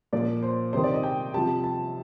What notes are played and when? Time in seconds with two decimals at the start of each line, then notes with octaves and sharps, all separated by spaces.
0.13 A#2 F3 D5
0.43 C5
0.73 C3 D#3 C5
0.84 D5
0.94 D#5
1.03 G5
1.34 C3 F3 A5
1.64 A5